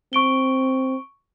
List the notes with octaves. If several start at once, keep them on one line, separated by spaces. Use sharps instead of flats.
C4 C#6 D7 G7